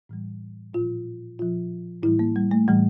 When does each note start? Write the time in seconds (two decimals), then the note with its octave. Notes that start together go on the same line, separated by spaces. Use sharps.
0.09 A2 E3 G3
0.74 A#2 F3 F4
1.39 A#2 F3 F4
2.03 A2 E3 G3 E4
2.19 A#3
2.36 G3
2.51 A3
2.68 A2 E3 G3